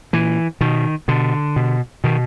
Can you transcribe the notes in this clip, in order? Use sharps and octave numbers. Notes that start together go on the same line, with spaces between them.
A#2 E3
B2 D#3
B2 D3
B2
B2 D#3